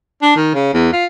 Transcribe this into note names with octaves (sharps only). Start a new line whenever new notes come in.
D4
D#3
C#3
E2
F4